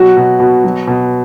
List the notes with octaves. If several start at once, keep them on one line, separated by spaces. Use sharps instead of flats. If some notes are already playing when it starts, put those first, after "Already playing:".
Already playing: B2 F#3 F#4
B2
B2
F#3
B2